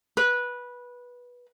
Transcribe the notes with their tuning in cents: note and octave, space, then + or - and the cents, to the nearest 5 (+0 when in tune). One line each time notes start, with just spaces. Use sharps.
B4 -15